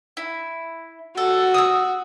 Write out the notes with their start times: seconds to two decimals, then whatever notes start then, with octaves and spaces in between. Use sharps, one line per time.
0.17 E4
1.17 F#4 A4
1.54 D#6 E6